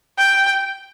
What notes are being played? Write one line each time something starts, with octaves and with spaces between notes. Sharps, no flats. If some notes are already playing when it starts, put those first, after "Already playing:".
G5